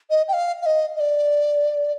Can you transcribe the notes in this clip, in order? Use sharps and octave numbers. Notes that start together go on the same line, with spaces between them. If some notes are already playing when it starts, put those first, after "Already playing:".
D#5
G5
F5
F5
D#5
D#5
D5